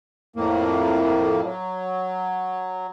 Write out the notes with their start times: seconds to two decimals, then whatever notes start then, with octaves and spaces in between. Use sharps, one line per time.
0.36 F2 A2 A#3
1.45 F#3